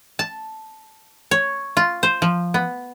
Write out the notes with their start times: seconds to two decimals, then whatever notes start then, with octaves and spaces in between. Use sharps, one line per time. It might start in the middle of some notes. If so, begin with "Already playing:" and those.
0.19 A5
1.31 C#5
1.77 F4
2.03 C5
2.22 F3
2.54 B3